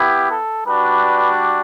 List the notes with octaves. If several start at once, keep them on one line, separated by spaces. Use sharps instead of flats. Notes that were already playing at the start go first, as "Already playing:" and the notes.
Already playing: B3 E4 G4
A4
G3 D4 F#4 B4